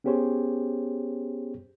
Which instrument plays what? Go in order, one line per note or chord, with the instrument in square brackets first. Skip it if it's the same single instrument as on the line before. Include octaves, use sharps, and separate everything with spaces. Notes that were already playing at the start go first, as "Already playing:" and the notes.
[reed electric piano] B3 C#4 G4 G#4 C5 C#5